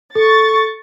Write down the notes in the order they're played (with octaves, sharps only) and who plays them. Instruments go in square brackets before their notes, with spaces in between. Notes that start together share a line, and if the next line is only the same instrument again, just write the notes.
[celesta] A4 [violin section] C#6 A6